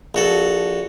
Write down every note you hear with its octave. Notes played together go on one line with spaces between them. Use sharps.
A#1 F#4 A4